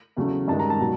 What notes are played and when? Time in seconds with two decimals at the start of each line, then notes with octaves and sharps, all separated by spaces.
0.16 E2 C#3 F#3 A3
0.48 G2 D#3 G#3 A5
0.59 A#5
0.70 A5
0.80 B2 F#3